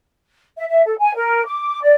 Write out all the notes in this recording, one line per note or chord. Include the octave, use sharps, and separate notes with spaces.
E5
E5
A4
G#5
A#4
D6
D5